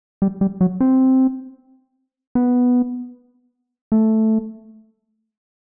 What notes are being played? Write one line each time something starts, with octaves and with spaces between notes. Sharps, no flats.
G3
G3
F#3
C4
B3
A3